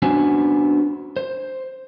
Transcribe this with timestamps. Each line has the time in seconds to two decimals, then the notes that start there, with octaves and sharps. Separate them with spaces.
0.02 B3 C#4 D4 F#4 C5 G#5
1.17 C5